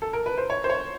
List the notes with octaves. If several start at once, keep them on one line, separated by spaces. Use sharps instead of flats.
A4
A#4
B4
C5
C#5
C5
C#5